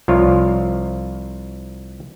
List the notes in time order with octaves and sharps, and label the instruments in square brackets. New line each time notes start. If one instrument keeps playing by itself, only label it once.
[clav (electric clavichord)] C2 F3 F4 C#5